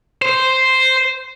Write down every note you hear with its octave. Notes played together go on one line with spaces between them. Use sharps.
C5